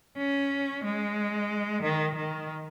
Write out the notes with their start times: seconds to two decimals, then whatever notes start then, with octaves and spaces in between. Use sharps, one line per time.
0.18 C#4
0.84 G#3
1.83 D#3
2.16 D#3